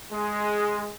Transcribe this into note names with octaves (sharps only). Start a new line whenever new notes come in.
G#3